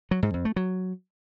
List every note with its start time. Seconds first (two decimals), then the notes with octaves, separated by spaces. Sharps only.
0.11 F#3
0.23 G#2
0.34 F2
0.45 A3
0.56 F#3